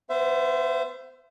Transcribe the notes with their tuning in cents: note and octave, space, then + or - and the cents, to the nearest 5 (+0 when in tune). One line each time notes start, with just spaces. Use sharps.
B3 +20 C5 -15 E5 +30